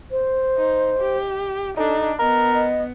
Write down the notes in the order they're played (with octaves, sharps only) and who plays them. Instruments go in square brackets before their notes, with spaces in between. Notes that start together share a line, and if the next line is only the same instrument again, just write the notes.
[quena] C5
[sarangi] D#4
G4
[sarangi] D4 [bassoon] D#4 [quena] A4
[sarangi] B3 [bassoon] A#4 [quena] D#5
[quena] D#5